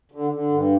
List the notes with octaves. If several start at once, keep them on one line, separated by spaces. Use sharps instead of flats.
D3
D3
G2